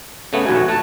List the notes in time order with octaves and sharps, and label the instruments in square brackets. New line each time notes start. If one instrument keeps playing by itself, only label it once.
[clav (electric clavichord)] C#3 A3 B3
[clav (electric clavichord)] A#1 D#2 G#5 [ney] F#4
[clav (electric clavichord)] A3 [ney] A5